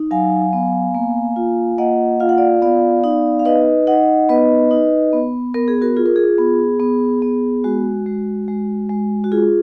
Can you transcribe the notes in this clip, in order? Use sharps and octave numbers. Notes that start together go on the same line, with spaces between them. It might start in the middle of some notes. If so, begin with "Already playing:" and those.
Already playing: D#4
F#3 F5 G#5
B3
A#3
F4
A#3 D#5 F#5
F4 F5
F#5
D5 F5
B3 D5 F5
D#4
F5
D#4 B4 D#5
D#4 D#5 F#5
B3 B4 D#5
D#4
B3
B3 A#4
G#4
F#4 A#4
F4 G#4
A#4
G#4
B3
B3
B3
G#3 F#4
G#3
G#3
G#3
F#4
F4 G#4